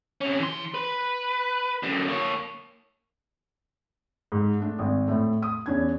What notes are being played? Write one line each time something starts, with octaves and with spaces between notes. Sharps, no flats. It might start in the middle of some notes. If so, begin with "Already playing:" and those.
C3 C#4
E3 C6
B4
F#2 D3
A#3 C#5
G#2
A3 D4
G#1
A2 A3
D#6
E2 C#4 D4 G#6